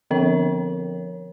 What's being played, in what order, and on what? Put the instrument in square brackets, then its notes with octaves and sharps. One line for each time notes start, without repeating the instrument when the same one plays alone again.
[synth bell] D3 F3 C4 A#4 C#5